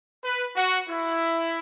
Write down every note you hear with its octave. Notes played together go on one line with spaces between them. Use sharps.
B4
F#4
E4